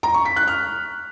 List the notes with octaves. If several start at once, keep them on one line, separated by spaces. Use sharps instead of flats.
A#5
C#6
B6
F#6
F6